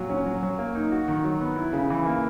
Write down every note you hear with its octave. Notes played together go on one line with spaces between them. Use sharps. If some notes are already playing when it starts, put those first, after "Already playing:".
Already playing: A#2 F#3 F#4
C#4
F#3
F#3
A#3
D#4
F#4
D#3
F#3
B3
E4
C#3
E3
A#3